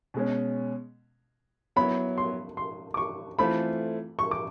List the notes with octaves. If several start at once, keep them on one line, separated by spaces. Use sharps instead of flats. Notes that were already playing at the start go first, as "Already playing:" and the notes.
B2 G#3 C#4
F#3 B3 E4 B5
C6
C6
D6
C#6
E3 A3 C4 F4 A4 B5
C#6
D6